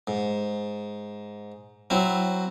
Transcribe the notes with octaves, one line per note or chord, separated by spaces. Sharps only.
G#2
F#3 C4 E4